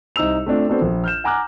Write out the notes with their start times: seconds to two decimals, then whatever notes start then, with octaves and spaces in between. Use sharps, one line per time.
0.16 C2 D#4 C5 E6 F7
0.46 A3 C4 D4 F4
0.69 B3 C4 D4 F#4 A4 C5
0.82 A#1
1.04 F6 G6 E7
1.24 F#5 G#5 A#5 D6 F6 F#6